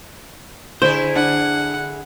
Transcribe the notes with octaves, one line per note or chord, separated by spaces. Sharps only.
D3 E4 G#4 C5
D4 F#5